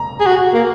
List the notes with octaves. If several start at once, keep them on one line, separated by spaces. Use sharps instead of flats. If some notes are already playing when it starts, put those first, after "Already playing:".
Already playing: A#5
G#4
F#4
A#3